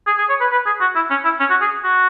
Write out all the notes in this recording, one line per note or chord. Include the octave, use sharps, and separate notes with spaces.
G#4
G#4
C#5
B4
B4
G#4
F#4
E4
C#4
E4
C#4
F#4
G#4
F#4